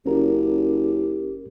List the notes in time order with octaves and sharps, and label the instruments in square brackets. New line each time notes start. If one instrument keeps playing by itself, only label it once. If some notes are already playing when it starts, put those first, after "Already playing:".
[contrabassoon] F#1 [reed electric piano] C#4 A#4 [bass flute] G4